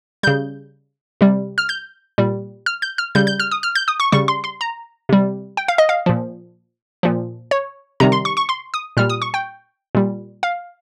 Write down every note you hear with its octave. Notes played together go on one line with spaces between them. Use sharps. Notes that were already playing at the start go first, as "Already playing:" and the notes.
C#3 G3 G6
C3 G3
F6
G6
A#2 G3
F6
G6
F6
C#3 G3 G6
G6
F6
D#6
F6
G6
D#6
C#6
C#3 G3 C#6
C6
C6
A#5
C3 G3
G5
F5
D#5
F5
A#2 F3
A#2 F3
C#5
C3 D#3 G3 A#5
C6
C#6
C#6
C6
D#6
A#2 G3 F6
D#6
C#6
G5
A#2 G3
F5